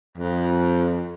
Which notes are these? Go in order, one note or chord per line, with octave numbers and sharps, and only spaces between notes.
F2